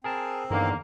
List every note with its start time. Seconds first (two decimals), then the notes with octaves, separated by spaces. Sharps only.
0.04 C4 G#4 A#4 A5
0.51 E2 G2 D3 D#3 A#3